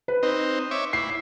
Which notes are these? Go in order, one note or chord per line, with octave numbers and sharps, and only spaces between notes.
B4
C4 D#4
C#5 E5 D6
E4 C7